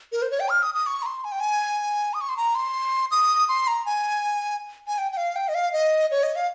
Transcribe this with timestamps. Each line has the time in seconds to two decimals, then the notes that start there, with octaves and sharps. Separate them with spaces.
0.12 A#4
0.22 C5
0.31 C#5
0.40 G5
0.49 F6
0.63 D#6
0.74 D#6
0.86 C#6
1.02 A#5
1.06 C6
1.24 G#5
1.32 G5
1.40 G#5
2.14 D#6
2.21 C#6
2.29 C6
2.37 A#5
2.55 C6
3.11 D#6
3.49 C6
3.67 A#5
3.86 G#5
4.87 G#5
4.98 G5
5.12 G5
5.17 F5
5.36 G5
5.48 D#5
5.55 F5
5.73 D#5
6.11 C#5
6.23 D#5
6.36 F5